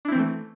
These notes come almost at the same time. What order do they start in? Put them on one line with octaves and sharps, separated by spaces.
D4 E4 C4 E3 A3